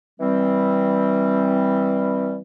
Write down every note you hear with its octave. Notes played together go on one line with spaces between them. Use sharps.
E3 G3 C4